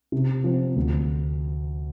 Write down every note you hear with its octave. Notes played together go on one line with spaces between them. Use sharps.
C3
F3 C4
D2